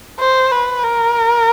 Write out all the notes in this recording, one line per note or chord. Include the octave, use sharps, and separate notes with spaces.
C5
B4
A#4